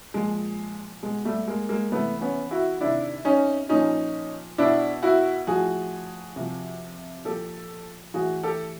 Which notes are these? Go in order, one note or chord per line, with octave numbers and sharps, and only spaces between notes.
A#2 F3 G#3
B2 G#3
G3 A3
G#3 A#3
G#3 A#3
C3 E3 A3 B3
B3 C#4
E4 F#4
C3 D#3 D4 E4
C#4 D#4
A#2 F3 C#4 D#4
B2 D4 E4
E4 F#4
A2 F3 F#4 G#4
C3 F3
A#2 F3 G4 A4
A2 E3 F#4 G#4
G4 A4